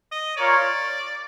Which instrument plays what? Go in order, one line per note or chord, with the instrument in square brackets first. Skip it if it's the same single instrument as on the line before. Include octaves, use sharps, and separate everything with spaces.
[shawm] D#5
[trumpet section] F4 A#4 C#5 [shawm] D5